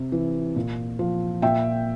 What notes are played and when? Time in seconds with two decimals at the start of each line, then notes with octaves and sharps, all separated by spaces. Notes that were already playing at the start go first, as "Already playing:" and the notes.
Already playing: C3
0.12 E3
0.56 A#2
0.99 F3
1.42 A#2 E5 G5